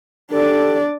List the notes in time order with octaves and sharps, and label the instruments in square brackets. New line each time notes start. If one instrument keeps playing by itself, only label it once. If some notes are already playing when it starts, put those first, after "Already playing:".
[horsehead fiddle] D4 D5 [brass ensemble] G4 A4